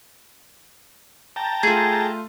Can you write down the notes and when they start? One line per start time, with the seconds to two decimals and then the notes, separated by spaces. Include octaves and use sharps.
1.36 G5 A5 A#5
1.63 A3 F4 G#4